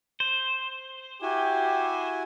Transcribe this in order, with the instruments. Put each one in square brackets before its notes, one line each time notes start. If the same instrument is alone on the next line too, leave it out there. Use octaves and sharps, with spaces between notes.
[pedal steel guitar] C5
[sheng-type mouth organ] E4 F#4 G#5 [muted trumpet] G4